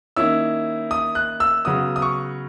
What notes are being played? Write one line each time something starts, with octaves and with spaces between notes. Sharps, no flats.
D#3 A#3 C#4 E4 E6
D#6
F#6
E6
C#3 F#3 B3 D#6
D#6
C#6